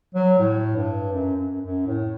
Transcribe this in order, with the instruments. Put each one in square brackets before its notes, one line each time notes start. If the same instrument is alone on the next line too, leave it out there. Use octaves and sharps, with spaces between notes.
[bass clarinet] F#3
A2
G2
F#2
F#2
F#2
A2